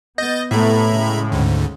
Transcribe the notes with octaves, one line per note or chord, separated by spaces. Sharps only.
B3 D#5 G6 A6
A2 C3 A3 B3 E5 A#5 B5
C#3 G#3
D2 G#2 D3